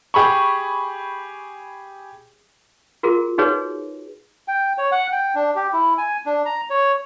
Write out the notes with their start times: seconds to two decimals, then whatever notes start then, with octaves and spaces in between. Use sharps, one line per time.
0.14 G4 G#4 B5 C#6
3.03 F4 F#4 G#4 A#4
3.38 D#4 F#4 G#4 B4 C#5
4.48 G5
4.78 C#5
4.92 F#5
5.12 G5
5.35 D4
5.56 G4
5.73 E4
5.98 G#5
6.26 D4
6.46 A#5
6.70 C#5